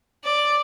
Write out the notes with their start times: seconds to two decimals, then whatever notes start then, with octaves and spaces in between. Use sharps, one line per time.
0.24 D5